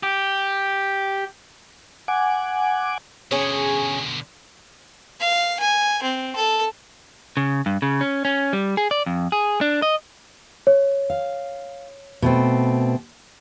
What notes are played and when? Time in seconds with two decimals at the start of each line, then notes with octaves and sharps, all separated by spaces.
0.03 G4
2.08 F#5 G#5 D6
3.31 B2 D3 C#4 G#4
5.20 F5
5.60 G#5
6.03 C4
6.36 A4
7.37 C#3
7.66 G2
7.82 C#3
8.01 C#4
8.25 C#4
8.53 G3
8.77 G#4
8.91 D5
9.06 F2
9.32 G#4
9.61 D4
9.82 D#5
10.67 C#5
11.10 F5
12.22 B2 A3 C4